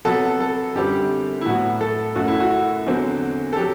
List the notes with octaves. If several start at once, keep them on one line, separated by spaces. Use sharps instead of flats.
C3 F#3 B3 A4
A4
F#2 D3 G3 C4 G4
E4
A2 F#3 B3 F#4
A4
F#2 F#3 A3 F#4
E4
F#4
E2 D3 F#3 C4
A4
F#3 G4